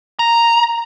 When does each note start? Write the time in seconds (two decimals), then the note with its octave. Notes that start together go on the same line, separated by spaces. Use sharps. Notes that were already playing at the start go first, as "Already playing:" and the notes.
0.19 A#5